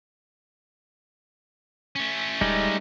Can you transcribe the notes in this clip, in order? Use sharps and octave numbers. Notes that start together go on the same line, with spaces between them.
A3 C#4
D1 G3 G#3 D#4